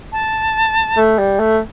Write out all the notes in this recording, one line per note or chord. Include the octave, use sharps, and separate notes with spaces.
A5
A3
G3
A3